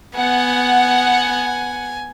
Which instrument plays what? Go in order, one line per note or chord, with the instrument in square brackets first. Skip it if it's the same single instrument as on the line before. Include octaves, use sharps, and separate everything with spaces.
[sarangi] B3 [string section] F#5 [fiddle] G#5